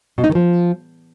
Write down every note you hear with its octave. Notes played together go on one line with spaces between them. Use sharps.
B2
D#4
D#3
F3